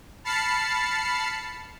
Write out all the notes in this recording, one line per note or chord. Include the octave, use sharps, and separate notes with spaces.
A5 B5 F6 A6 C7 C#7